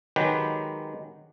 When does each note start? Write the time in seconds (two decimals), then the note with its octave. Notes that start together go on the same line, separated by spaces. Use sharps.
0.16 D#3 F#3 G#3 G4 B4 G5